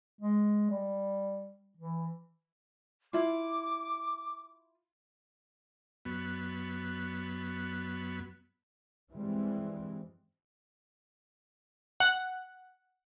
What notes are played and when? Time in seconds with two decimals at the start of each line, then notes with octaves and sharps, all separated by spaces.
0.21 G#3
0.70 G3
1.77 E3
3.13 E4 F4 D6
6.05 F#2 B3
9.11 G2 E3 G3 G#3 C4
12.00 F#5